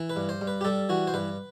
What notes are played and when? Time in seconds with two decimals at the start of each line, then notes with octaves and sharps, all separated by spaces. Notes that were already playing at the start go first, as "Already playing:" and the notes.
Already playing: E3
0.10 B4
0.16 G2
0.29 C5
0.41 G2
0.47 B4
0.61 G4
0.65 G3 A4
0.89 E3 F#4
1.07 C5
1.14 G2 B4